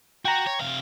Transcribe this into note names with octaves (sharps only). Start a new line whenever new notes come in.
F#4 G5 A#5
C#5
C3 F5